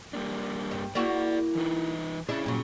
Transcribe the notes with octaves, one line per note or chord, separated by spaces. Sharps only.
G3 A#3 D4
G2
A#3 E4 F#4 G#4 D5
E3 D#4 B4
C#4 D4 E4 G#4 E5
G2 A#2 F#3